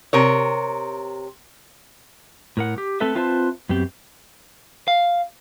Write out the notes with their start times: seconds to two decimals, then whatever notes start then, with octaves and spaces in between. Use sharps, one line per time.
0.13 C3 A#4 C#5
2.57 A2 A#4 F#5
2.78 G4
3.00 A3 C4 A4 B4 E5
3.15 C4 F4 B4 C5 E5 A5
3.69 F#2 B3 C4 G4
4.88 F5